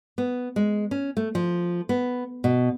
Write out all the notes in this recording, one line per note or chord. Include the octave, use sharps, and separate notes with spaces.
B3
G#3
C#4
A3
F3
B3
B2